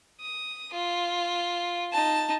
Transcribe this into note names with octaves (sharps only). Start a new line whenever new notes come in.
D#6
F4
D#4 A5